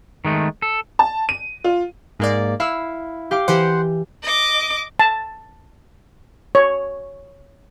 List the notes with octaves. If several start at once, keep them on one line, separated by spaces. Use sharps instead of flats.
D#3 G#3 A3
A4
A5
D#7
F4
G#2 A#3 D5
E4 F5 E6
G4 F5 D6
E3 G4 C5 F#5
D#5 D6
A5
C#5